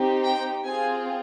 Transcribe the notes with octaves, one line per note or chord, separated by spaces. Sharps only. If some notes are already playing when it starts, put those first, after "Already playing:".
Already playing: C4 D#4 G4
G5
C4 F4 G#4 G#5